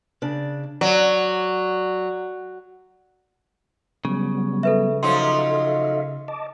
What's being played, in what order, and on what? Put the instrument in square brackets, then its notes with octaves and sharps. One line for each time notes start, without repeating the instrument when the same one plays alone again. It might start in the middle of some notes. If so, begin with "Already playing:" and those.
[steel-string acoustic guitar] C#3 D4
[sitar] F#3 [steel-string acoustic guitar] D5
[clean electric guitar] C#3 [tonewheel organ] F#3 G3 B3
[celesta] A4 B4 E5
[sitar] F3 F#3 D#4 [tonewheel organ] A4 E5 F5 [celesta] C6
[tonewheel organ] D#5 A5 D6